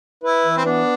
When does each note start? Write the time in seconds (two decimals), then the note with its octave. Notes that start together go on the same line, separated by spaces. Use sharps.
0.23 E4 B4
0.45 E3
0.57 C4
0.65 B3 D4